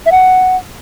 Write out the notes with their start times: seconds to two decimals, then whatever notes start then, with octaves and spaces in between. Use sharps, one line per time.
0.06 E5
0.12 F#5